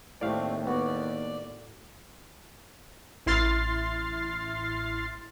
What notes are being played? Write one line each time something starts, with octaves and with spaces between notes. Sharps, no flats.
D#2 A2 A3 C4 G4 D5 F5
B3 F#4 D5
A1 E4 C6 F6 A6 C7